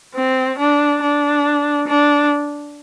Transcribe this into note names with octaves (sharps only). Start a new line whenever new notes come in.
C4
D4
D4
D4